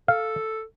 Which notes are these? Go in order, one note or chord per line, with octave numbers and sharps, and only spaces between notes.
A4 F5